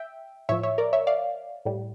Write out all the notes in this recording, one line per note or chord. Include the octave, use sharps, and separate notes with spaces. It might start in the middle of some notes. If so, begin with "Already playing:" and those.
Already playing: E5 G5
A2 F3 C#5 E5
C#5 E5
A#4 D5
C#5 E5
D5 F5
A2 G3